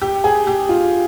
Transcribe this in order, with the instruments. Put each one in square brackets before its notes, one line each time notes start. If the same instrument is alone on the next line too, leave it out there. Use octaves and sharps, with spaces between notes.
[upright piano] G4
G#4
G4
F4